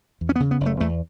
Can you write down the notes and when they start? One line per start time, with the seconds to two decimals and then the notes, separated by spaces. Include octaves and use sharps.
0.21 E2
0.29 C#4
0.36 B3
0.40 C#3
0.51 B3
0.61 F#1
0.66 A3
0.80 E2 A3